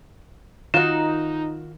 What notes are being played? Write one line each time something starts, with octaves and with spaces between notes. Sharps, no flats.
D#3 D#4 F4 F#4 E7